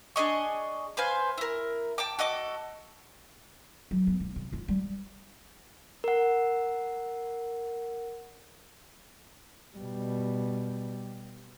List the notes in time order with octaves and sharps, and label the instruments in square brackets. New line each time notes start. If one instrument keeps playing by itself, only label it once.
[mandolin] D4 G#4 D#5 C#6
B4 C5 F5 G#5
E4 A#4
G5 A5 D6
F#4 A4 D#5 D6
[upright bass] F#3
B3
B1
C3
F4
G3
[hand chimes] A#4 F#5
[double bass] B2 G3